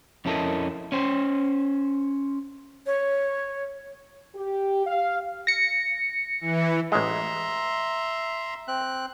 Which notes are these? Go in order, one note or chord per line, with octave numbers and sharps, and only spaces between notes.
F2 C#4 E4 A4 A#4 D#5
C#4 C5
C#5
G4
F5
A#6 C#7
E3
A1 G#3 E5 A#5 C6
C4 F#6